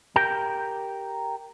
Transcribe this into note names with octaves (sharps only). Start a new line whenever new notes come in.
G4 A#4 G5